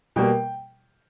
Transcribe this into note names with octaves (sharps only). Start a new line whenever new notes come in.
B2 G3 A#3 G5